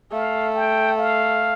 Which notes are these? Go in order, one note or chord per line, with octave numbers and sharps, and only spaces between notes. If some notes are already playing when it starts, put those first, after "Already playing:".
A3 F5
G5
F5